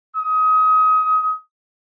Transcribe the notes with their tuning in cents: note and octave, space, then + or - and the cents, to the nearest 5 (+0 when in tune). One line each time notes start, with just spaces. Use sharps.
D#6 +25